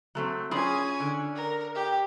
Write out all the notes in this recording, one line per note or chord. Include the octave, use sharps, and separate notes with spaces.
F#3 A3 C4
C#4 E4 F4 G#4 G#5
D3
A#4
G4